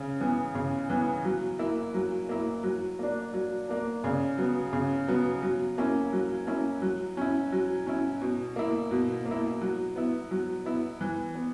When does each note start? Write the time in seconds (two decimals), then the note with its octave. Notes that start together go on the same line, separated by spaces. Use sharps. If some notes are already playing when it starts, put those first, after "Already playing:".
Already playing: C#3
0.21 E3 B3
0.55 C#3
0.90 E3 B3
1.25 F#3
1.59 A#3 E4
1.94 F#3
2.29 A#3 E4
2.64 F#3
2.99 A#3 D4
3.33 F#3
3.69 A#3 D4
4.04 C#3
4.38 F#3 B3
4.73 C#3
5.08 F#3 B3
5.42 F#3
5.78 A#3 C#4 E4
6.13 F#3
6.47 A#3 C#4 E4
6.82 F#3
7.17 C#4 E4
7.52 F#3
7.86 C#4 E4
8.22 B2
8.56 A#3 E4
8.91 B2
9.26 A#3
9.31 E4
9.61 F#3
9.96 B3 E4
10.31 F#3
10.65 B3 E4
11.01 E3
11.35 B3